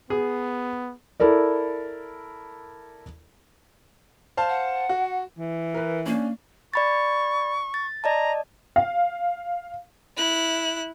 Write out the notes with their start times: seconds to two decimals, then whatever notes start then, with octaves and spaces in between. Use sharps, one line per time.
0.10 B3 G#4
1.20 E4 A4 A#4 D5
4.37 C5 F5 A5
4.49 F#5
4.89 F#4
5.38 E3
5.74 A#4 B4
6.06 A#3 C#4 D4
6.74 D5 B5 C#6 A6
7.74 A6
8.04 D5 D#5 A5 A#5
8.76 F5
10.16 E4 F#6